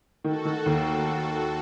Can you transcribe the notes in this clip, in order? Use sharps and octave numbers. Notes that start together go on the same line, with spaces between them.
D#3 F#4 A4
D#3
D#2